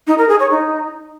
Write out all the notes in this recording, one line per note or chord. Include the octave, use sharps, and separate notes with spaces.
D#4
A#4
G#4
C#5
D#4